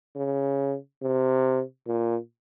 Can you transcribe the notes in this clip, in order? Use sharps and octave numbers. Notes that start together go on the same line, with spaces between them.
C#3
C3
A#2